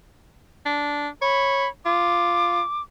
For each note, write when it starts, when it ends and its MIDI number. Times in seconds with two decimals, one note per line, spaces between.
0.66 1.08 62
1.22 1.66 73
1.22 1.69 83
1.85 2.61 65
1.85 2.82 86